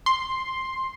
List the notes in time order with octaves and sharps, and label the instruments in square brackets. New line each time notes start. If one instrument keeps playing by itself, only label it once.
[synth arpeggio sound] C6